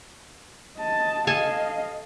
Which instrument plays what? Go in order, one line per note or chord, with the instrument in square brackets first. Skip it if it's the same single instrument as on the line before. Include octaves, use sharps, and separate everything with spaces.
[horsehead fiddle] D#5 A5
[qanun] A4 G#5 A5 [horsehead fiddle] D#5 F5